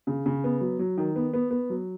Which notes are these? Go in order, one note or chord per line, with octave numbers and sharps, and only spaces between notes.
C#3
C#3
B3
F#3
F#3
D#3
B3
B3
B3
F#3